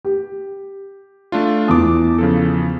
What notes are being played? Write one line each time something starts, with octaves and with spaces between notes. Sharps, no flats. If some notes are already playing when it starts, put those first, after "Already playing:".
G4
A3 D4 F4
E2 A5 D6 D#6
C#3 F3 A4